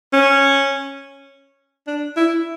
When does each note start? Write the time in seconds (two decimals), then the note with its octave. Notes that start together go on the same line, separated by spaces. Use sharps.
0.13 C#4
1.87 D4
2.17 E4